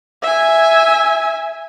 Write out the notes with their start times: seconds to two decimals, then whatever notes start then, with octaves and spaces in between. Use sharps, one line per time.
0.23 E5 G#5